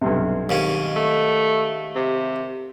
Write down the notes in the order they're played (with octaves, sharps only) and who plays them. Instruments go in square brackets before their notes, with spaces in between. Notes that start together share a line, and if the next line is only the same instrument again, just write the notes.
[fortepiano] B1 G2 C3
[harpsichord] D#2 G#2 C#4
[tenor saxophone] A3
C3